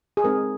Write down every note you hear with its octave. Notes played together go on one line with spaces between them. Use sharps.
G#4
G#3 C4 D#4 A#4